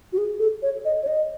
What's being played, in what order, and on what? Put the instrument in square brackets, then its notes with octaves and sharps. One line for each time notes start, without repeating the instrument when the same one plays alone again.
[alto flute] F#4
G#4
A4
C#5
D#5
C#5
D#5